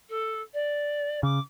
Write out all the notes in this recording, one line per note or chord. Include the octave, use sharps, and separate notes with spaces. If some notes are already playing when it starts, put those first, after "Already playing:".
A4
D5
C#3 D6